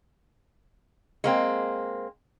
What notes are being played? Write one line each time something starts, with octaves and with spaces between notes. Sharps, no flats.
G#3 A#3 C4